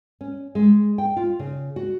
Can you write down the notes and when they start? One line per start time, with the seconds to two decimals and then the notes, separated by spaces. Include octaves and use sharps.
0.21 C#4
0.55 G#3
0.98 G5
1.17 F4
1.39 C#3
1.76 F#4